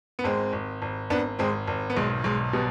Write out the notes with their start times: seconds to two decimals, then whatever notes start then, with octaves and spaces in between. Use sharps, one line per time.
0.19 B3
0.24 G#1 G#3 C4
0.53 G#1
0.82 G#1
1.10 G#1 B3 D4
1.39 G#1 G#3 C4
1.68 G#1
1.90 B3
1.96 B1 G#3
2.24 B1 G#3
2.53 B2 G3 B3